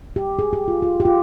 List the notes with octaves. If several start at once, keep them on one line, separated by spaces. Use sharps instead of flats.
G4
G#4
G4
F4
F4
G4
F4